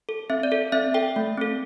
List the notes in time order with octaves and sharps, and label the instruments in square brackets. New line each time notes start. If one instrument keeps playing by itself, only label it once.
[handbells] A4
C4 E5
D5
A4
C4 E5
A4 G5
A3
C4 A4